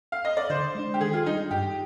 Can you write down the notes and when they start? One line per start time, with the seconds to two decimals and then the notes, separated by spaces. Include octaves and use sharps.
0.12 F5
0.25 D#5
0.37 D5
0.50 D3 C5
0.75 G#3 D4
0.94 G4
1.01 D#3 G#4
1.13 F4
1.26 G3 D4 D#4
1.51 G2 G4